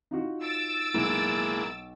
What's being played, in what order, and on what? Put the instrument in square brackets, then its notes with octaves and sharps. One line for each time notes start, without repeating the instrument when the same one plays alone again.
[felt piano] D#4 F4 F#4
[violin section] E6 A6 D7
[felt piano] B1 [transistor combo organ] G#3 A#3 E4